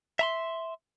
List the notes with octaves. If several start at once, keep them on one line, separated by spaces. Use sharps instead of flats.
E5 A#5 C6